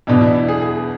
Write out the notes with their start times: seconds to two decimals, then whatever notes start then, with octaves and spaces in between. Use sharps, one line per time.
0.07 E2 B2 D4
0.21 E4
0.35 E4
0.48 G#4
0.62 G#4
0.76 G#4